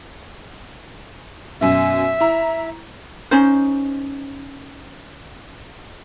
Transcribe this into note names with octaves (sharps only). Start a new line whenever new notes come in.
F#2 B2 E5
E4 A#5
C#4 D#4 C5